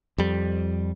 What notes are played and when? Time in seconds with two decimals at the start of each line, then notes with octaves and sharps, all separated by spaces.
0.18 F2 G3